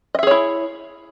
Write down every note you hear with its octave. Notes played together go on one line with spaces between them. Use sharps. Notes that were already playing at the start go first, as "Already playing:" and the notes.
E4 G#4 C#5 D#5 E5